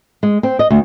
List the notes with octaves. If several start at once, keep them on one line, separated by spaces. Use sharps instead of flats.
G#3
C4
D#5
D2